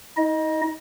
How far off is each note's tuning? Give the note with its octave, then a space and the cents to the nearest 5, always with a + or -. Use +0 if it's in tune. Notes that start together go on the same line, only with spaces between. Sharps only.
D#4 +40 D#5 +0